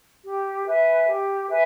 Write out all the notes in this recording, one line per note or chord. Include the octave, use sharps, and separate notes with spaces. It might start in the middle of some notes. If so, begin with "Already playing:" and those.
G4
B4 E5 G#5
G4
B4 E5 G#5